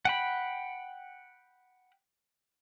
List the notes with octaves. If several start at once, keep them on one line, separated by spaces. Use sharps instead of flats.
F#5 G5 B5